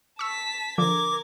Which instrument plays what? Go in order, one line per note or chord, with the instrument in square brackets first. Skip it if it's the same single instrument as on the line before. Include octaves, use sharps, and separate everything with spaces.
[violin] A5 B6 [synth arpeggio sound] C#6 E6
[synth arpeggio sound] D3 F3 [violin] A#4 G#6 [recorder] D6